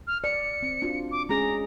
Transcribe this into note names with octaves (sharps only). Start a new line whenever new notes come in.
F6
D5 C#7
C4
D4 F4 F#4
D6
G#3 C#4 G#4 A#5